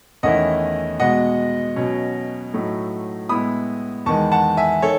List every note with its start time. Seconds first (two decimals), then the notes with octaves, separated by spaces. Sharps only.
0.23 E2 D#3 A3 C#4 E4 D#5 F#5
1.00 B2 G#3 B3 D#5 F#5
1.76 B2 F#3 C#4
2.53 A2 F#3 A3 D#4
3.29 A2 G#3 B3 E4 B5 D#6
4.06 E2 D#3 G#3 A5 C#6
4.32 F#5 A5
4.57 E5 G#5
4.82 D#3 A4 C#5